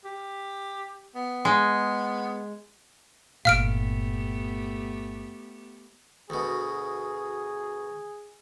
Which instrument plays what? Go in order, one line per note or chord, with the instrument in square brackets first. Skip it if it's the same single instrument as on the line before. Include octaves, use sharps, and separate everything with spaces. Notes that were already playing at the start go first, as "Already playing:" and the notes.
[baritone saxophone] G4
B3
[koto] G#3
[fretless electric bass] G1 A#2 [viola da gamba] A3 B3 G4 [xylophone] F5 F6 D7
[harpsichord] D2 B2 [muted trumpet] G#4